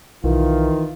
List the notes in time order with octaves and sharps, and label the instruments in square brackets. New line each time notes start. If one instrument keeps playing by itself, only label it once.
[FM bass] B1 [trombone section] D#3 F4 [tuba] E3